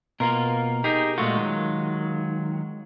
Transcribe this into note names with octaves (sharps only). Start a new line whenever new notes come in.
B2 A#3 F4 A#4
D#4 G4 G#4 A#4
A#2 G#3 A3 F4 F#4
D#3 F#3